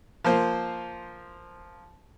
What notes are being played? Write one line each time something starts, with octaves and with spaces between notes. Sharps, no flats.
F3 A#3 C5